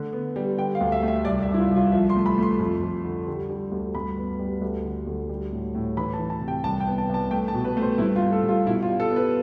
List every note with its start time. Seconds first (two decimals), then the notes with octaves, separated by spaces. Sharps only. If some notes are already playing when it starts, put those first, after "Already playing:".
Already playing: D3 A3
0.13 B3
0.36 G3
0.58 D3 G5
0.75 F5
0.81 D2
0.92 E5
1.03 A3
1.08 E5
1.25 C2 D5
1.43 E5
1.48 C2
1.54 E4
1.59 F4
1.71 C2
1.76 F4
1.92 F3 E5
2.10 C6
2.16 A3
2.26 B5
2.38 A3 C6
2.59 F2
2.83 F2
3.05 D3
3.27 G3
3.50 G3
3.72 D2
3.95 G2 B5
4.18 B3
4.39 G3
4.61 D2
4.85 D3
5.07 D2
5.29 G3
5.52 A2
5.75 A2
5.97 E3 B5
6.13 A5
6.19 E3
6.30 A5
6.41 C3
6.48 G5
6.64 C2 A5
6.80 G5
6.87 B3
6.98 A5
7.09 C2 A5
7.31 A3 G5
7.48 A5
7.54 B2
7.65 B4
7.77 A3 C5
7.98 G2 E4
8.16 F4
8.22 A3
8.32 A4
8.44 G2 F4
8.66 B2 E4
8.83 F4
8.88 G3
9.00 A4
9.10 B3
9.16 B4